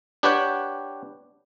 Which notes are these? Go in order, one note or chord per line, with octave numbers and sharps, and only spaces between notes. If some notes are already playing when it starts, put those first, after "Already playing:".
D4 G4 B4 C#5 F#5 G5